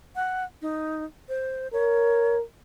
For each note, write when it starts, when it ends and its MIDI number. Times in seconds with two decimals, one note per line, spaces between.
0.16 0.44 78
0.62 1.04 63
1.29 1.68 72
1.73 2.42 70
1.73 2.37 73